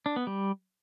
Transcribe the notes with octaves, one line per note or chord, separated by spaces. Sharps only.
D4
B3
G3